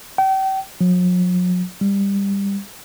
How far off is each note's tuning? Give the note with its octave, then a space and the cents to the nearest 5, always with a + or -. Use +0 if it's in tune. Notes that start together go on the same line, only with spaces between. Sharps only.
G5 -35
F#3 -45
G3 +20